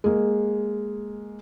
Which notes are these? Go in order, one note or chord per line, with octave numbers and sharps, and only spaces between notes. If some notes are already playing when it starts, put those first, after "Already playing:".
G#3 A#3